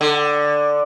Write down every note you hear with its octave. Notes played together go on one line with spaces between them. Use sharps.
D3